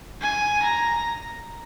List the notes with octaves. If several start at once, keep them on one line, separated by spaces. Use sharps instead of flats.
G#5
A#5